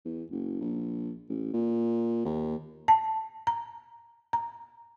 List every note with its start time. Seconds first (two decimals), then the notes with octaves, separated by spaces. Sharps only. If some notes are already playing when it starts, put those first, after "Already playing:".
0.05 E2
0.31 F#1
0.61 A#1
1.29 A1
1.54 A#2
2.25 D#2
2.88 A5
3.47 A#5
4.33 A#5